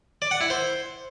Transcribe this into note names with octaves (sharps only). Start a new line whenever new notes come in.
D5
F#5
E4
C5